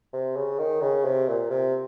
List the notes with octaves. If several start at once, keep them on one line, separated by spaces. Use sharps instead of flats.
C3
C#3
D#3
C#3
C3
A#2
C3